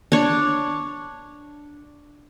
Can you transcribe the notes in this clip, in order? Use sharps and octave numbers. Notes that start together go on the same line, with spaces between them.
D4 C#5